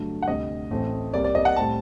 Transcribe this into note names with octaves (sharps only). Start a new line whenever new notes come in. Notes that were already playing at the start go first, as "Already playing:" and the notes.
Already playing: G2 D3 F#3 A3
F#5
D2 C3 G3 D#5
A1 A2 A3 C4
C2 C3 G3 A#3 D5
D5
D#5
F#5
A2 G3 C4 A5